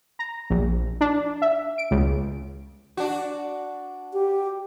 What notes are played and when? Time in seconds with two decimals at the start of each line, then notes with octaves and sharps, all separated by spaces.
0.19 A#5
0.50 A#1
1.01 D4
1.42 E5
1.78 D7
1.91 C#2
2.97 D4 F#4
4.13 G4